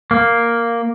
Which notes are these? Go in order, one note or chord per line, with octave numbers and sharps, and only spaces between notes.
A#3